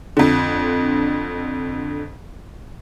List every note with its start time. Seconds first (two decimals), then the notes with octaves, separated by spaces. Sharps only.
0.17 F2 D3